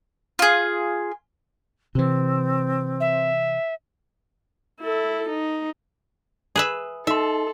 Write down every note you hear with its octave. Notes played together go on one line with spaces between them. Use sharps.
F4 G#4
C3 E3 C4
E5
E4 A4
D#4
G#4 B4 E5
D#4 A4 E5 C6